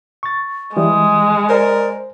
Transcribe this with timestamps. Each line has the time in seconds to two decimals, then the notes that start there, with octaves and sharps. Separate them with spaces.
0.23 C#6 A6
0.77 E3 G3 G#3 D#6
1.50 A#4 C5 D5